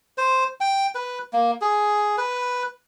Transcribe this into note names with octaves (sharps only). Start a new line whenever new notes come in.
C5
G5
B4
A#3
G#4
B4